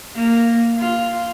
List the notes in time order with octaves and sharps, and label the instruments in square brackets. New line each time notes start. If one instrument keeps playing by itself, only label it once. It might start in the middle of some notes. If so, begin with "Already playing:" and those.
[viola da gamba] A#3
F4